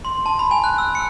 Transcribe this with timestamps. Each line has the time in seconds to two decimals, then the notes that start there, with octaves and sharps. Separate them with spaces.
0.05 C6
0.26 A5
0.39 B5
0.51 G#5
0.64 F#6
0.78 E6
0.95 C#7